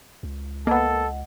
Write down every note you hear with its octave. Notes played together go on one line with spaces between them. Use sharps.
C#2
A#3 B3 A4 D#5 F#5